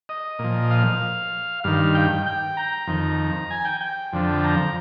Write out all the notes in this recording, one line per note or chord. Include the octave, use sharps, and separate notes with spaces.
D#5
A#2
F3
F5
G2 D#3 F5
G5
G5
A#5
F2 D#3
G#5
G5
G5
F2 D3 F3
A#5